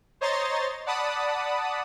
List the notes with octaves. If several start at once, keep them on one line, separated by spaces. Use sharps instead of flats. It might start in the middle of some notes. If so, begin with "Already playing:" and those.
C5 C#5 D#5 A#5 C6 A6
D5 F#5 A5 B5 D#6